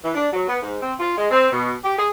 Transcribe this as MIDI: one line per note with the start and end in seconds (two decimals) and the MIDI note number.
0.03 0.11 52
0.15 0.26 62
0.32 0.46 54
0.48 0.57 59
0.62 0.77 44
0.81 0.92 60
0.99 1.16 65
1.17 1.29 56
1.31 1.50 60
1.52 1.73 47
1.83 1.97 67
1.98 2.09 68